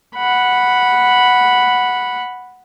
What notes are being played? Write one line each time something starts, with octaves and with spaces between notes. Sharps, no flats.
F#5 B5